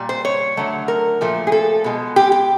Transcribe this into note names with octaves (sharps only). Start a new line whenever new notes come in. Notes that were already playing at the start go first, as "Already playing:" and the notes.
Already playing: A#2 G3
C5
C#5
D3 F#3 A3
A#4
A#2 F3 A3
G#4
A4
B2 G#3
G4
G4